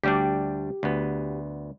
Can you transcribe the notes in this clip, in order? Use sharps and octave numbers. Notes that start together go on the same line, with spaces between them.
D2 G3 D4 G4
D2 B3